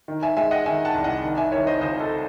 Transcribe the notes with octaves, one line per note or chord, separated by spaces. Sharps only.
D#3
E5 G#5
G#3 E5 G#5
D#5 F#5
D#3 E5 G#5
F#5 A5
C2
D#5 F#5
D#3
E5 G#5
D#3 C#5 E5
C5 D#5
C#2 C5 D#5
A4